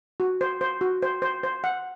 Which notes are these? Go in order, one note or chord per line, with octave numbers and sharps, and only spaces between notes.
F#4
C5
C5
F#4
C5
C5
C5
F#5